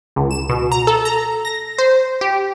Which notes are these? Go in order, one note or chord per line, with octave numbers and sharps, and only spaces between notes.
C#2
E7
B2
A#5
A4
A#5
A#6
C5
G4